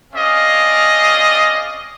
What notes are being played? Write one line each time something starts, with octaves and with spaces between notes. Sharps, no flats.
C4 C#4 G#4 D5 D#5 F5